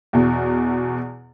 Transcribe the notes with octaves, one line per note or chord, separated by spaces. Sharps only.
E2 B2